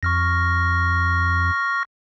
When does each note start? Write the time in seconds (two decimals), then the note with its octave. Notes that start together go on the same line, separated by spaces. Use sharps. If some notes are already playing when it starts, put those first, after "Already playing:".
0.03 F2 C#6 F6 A#6